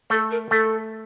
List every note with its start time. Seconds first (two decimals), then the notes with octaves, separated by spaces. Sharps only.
0.10 A3 A4
0.31 A#4
0.51 A3 A4